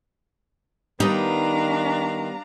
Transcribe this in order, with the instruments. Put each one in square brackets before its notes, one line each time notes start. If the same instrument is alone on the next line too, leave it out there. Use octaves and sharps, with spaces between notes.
[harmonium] D#3 [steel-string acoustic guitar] G3 B3 [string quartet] D4 F5 A#5 [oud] D#4